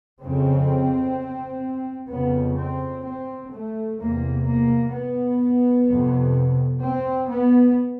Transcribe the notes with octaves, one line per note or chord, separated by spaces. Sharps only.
F2 C#3 C4
F2 C#3 B3
C4
C4
A3
E2 C3 A#3
A#3
B3
F2 C3
C4
B3